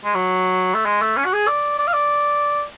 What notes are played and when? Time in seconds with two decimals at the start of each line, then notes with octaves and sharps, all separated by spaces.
0.04 G#3
0.15 F#3
0.74 A3
0.85 G#3
1.01 A3
1.17 C#4
1.25 F#4
1.33 G#4
1.47 D5
1.78 D5
1.88 F5
1.93 D5